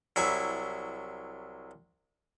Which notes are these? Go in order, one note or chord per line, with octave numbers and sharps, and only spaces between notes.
C2 F#3 E4 G#5 B5